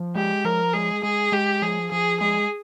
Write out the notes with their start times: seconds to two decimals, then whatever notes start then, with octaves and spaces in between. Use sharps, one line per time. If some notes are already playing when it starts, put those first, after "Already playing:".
Already playing: F3
0.15 G#3 G4
0.45 F3 A#4
0.73 G#3 G#4
1.03 G#3 G#4
1.32 G#3 G4
1.62 F3 G#4
1.91 F3 G#4
2.20 G#3 G#4